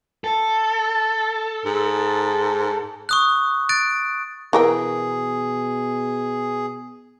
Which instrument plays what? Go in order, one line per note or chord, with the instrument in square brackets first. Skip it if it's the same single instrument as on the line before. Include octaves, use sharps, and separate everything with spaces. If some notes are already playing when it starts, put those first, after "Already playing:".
[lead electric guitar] A4
[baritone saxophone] G#2
[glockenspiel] C#6 D#6 F#6
F#6 A6 D7
[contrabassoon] B2 [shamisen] E3 A#4 G5 [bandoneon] G#4